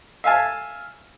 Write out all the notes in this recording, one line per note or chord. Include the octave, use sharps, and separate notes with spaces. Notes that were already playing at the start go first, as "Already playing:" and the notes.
E5 F5 G#5 A5